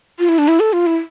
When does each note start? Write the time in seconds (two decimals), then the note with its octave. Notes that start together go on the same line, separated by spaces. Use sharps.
0.19 F4
0.29 E4
0.38 D4
0.48 E4
0.60 A4
0.73 F4
0.86 E4